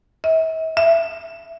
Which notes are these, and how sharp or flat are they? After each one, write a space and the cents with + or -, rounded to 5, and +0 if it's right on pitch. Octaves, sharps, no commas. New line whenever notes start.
E5 -45
E5 +20